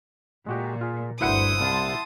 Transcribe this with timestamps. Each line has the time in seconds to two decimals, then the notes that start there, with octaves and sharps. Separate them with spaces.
0.46 A#2 G#3 F#4 G4
0.81 F4 G#4
1.21 G1 D2 E4 B4 C5 F#5 D#6 C#7
1.61 C2 F5 A5 C6